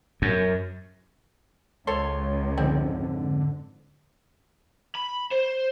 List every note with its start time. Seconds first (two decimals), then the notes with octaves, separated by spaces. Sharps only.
0.22 F#2
1.87 C#2 A4 C5 C#5 C6
2.58 F2 G#2 D3 G#3 C4
4.95 B5
5.31 C5